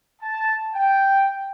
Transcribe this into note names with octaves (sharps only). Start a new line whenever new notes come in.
A5
G5